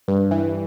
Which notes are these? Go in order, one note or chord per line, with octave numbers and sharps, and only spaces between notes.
G2
E3